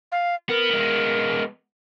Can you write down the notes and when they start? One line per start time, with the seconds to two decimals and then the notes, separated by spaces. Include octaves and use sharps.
0.12 F5
0.49 B3 A#4
0.71 G#3 B3